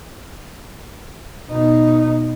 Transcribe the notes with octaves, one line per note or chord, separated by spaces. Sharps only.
B2 D#4